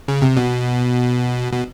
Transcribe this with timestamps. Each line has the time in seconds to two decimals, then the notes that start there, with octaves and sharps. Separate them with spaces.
0.08 C#3
0.22 C3
0.37 B2
1.53 B2